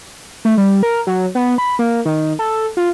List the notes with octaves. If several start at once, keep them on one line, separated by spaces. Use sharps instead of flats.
A3
G3
A#4
F#3
B3
B5
A#3
D#3
A4
F4